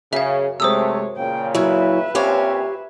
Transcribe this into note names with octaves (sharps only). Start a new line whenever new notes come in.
F#2 C#3 E5 F5
C3 G#3 A3 C5 C#5 D#6 E6
A#2 C#3 G5
F#3 E4 B4 E5
A#2 C4 C#4 G4 C#5 F5